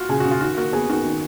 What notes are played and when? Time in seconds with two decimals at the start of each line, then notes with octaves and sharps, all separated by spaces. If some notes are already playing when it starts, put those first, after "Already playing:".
Already playing: F4 F#4
0.09 C#3 G#4
0.20 F#4
0.25 C#3
0.31 F4
0.41 D#3 F#4
0.57 A#3 F#4
0.73 B3 G#4
0.89 D#3 F#4
1.05 D#3